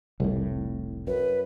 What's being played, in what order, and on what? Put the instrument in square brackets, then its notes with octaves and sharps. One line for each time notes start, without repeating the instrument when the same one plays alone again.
[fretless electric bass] F1 A2 [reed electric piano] C2
[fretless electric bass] F#2 [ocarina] B4